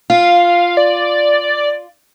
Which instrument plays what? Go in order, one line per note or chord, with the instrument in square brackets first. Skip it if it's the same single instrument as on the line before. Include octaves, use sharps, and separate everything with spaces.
[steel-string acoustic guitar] F4 [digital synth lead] F5
[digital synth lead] D5